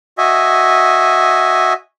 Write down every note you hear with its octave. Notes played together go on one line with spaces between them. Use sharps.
F#4 D#5 E5 G#5